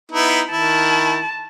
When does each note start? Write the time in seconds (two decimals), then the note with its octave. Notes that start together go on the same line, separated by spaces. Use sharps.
0.12 B3 D#4 E4
0.52 D#3 E4 A5